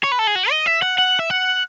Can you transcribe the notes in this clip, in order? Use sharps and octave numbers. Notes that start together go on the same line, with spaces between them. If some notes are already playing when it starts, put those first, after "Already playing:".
C#5
B4
A4
G#4
F#4
D#5
E5
F#5
F#5
E5
F#5